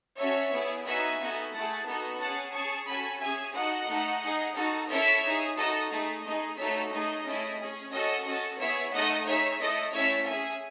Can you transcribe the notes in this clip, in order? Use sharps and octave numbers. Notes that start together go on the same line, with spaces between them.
C#4 F#4 A4 C#5 E5
B3 E4 G#4
B3 D#4 F#4 E5 G#5
B3 D#4 F#4 A4
A3 E4 G#4 F#5 A5
B3 D#4 F#4 A4
C#4 G#4 F#5 A5
C#4 G#4 A5 C#6
C#4 F#4 A4 G#5 B5
C#4 G#4 E5 G#5
D#4 F#4 A4 D#5 F#5
A3 D#4 A4
D#4 G#4
D#4 F#4 A4
C#4 E4 A4 C#5 E5
D#4 G#4
D#4 F#4 A4 D#5
A3 D#4 G#4
A3 D#4 G#4 D#5
A3 D#4 F#4 A4 C#5 E5
A3 D#4 G#4 D#5
A3 C#4 E4 G#4
C#4 G#4
C#4 F#4 A4 D#5
C#4 F#4 A4
B3 E4 G#4 C#5 E5
A3 D#4 A4 D#5 F#5
D#4 G#4 C#5 E5
A3 E4 A4 D#5
A3 C#4 E4 C#5 E5
C#4 G#4 E5 G#5